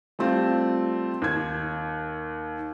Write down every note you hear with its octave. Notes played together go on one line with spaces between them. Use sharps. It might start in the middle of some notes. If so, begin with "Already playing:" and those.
G3 A3 C4 F4
D#2 G#6